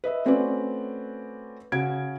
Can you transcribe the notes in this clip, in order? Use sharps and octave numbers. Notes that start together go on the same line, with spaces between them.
B4 D#5 E5
A3 C4 C#4 F#4 B4 D5
C#3 F#4 G#6 D7